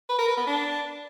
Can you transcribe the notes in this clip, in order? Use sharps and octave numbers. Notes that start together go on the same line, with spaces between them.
B4
A#4
B4
B3
D4